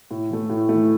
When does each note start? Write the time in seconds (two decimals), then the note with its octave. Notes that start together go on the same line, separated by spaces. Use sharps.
0.11 A2
0.30 E3 A3
0.50 A2
0.69 A3
0.74 E3